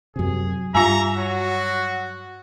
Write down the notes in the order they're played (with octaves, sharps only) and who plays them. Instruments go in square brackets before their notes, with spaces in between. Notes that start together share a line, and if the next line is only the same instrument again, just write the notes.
[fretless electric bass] F#2 C3 [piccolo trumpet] G#4
[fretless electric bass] G2 [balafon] F4 F5 G#5 [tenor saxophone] E5 [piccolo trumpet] A#5
[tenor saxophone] F#3 [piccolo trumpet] F#4